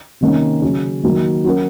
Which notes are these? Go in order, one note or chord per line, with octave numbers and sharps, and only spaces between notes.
C3 D#3 A#3 C#4
C#3 F#3 C#4
D#3 F#3 A#3
F#3 C#4 F#4 A#4